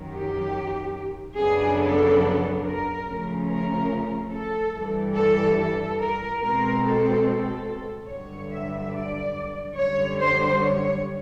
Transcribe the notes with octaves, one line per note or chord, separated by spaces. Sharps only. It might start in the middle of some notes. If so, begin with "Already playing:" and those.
Already playing: F#2 D#3 F#3
G4
F#2 C#3 F#3 B3 D4 G#4
A4
A#4
C#3 F3 A3 C#4
A#4
A4
G2 E3 G3
A4
A4
A#4
B2 G#3 C4 A#4
A4
A4
G2 D3 F#3 C#5
E5
D5
F#2 D3 G3 C#5
C5
C#5